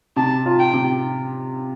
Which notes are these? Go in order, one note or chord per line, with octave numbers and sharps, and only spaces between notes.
C3 A5
F4
G5
C3